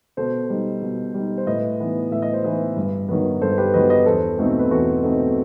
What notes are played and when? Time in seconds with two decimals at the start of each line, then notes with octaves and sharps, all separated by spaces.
0.17 B2 A4 C5
0.50 G3 D#4
0.82 B2
1.14 G3 D#4
1.38 C5
1.47 A2 B4 D#5
1.79 E3 B3 D#4
2.11 A2 E5
2.22 D#5
2.33 C5
2.44 E3 B3 D#4 B4 D#5
2.76 G2
3.09 D#3 F#3 B3
3.41 G2 A4 C5
3.58 G4 B4
3.74 D#3 F#3 B3 B4 D#5
3.90 B4 D#5
4.06 E2 A4 C5
4.39 B2 A3 C4 D#4
4.59 B4
4.71 E2 F#4 A4
5.03 B2 A3 C4 D#4